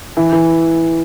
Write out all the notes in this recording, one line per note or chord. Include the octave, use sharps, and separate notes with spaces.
E3
E3